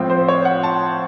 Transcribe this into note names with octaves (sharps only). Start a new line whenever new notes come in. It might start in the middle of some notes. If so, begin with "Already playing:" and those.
Already playing: A2 F3 C4
C5
C#5
F#5
A5